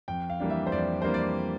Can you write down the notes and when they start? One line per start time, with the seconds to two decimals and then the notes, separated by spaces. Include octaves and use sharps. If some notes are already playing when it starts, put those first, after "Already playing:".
0.08 F2 G5
0.30 F5
0.40 E3 G3 A#3 D4
0.50 E5
0.67 C5
0.72 F2 D5
1.02 E3 G3 A#3 D4 C5
1.14 D5